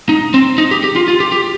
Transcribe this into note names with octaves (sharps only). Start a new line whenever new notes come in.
D#4
C4
D#4
G4
G4
F4
F4
G4
G4